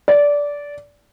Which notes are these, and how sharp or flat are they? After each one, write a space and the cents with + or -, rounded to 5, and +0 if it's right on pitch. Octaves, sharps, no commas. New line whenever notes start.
D5 -15